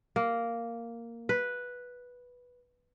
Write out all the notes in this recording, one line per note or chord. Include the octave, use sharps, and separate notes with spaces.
A#3
B4